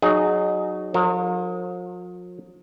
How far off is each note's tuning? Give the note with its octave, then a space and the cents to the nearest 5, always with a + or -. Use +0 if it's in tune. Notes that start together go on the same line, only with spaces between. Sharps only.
F#3 +0 D#4 -20 G#4 +10
F3 +45 A#4 -35